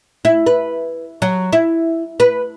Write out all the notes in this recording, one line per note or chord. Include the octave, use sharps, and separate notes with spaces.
E4
B4
F#3
E4
B4